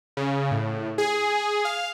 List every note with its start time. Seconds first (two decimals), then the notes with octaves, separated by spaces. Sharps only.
0.17 C#3
0.51 A2
0.98 G#4
1.65 F5